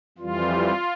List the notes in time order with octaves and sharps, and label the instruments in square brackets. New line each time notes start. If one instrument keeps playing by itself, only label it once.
[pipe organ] F2 E3 G3 F4